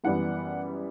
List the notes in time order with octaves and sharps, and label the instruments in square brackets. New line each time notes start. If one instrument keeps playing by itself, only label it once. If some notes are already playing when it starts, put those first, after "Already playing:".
[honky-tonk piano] F#2 E3 G3 B3 F#5